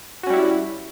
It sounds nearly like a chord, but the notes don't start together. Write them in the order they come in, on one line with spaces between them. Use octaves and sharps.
F#4 C#4 G3 E4